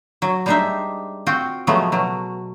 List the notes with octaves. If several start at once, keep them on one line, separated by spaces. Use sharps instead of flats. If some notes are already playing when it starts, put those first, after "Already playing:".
F#3
G3 G#3 D4 D#4 C5 E5
C4 F4 F#4 G5
C#3 F3 F#3 G#3 A3 B3
B2 F#3